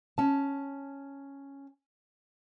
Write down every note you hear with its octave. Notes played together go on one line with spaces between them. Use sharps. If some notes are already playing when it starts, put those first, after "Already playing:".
C#4 A5